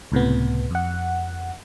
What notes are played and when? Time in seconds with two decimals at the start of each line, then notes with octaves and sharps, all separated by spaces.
0.12 C#2 A2 C3 B3
0.71 F2 F#5